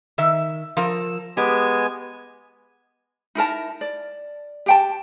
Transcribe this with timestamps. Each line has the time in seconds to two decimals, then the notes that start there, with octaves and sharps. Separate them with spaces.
0.18 D#3 E5
0.77 F3 A#4 E6
1.37 G#3 B3 G4 G#5
3.35 D#4 E4 A#4 A5
3.81 D5
4.66 G4 G5 A5